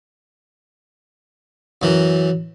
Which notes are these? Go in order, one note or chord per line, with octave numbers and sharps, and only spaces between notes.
F#2 E3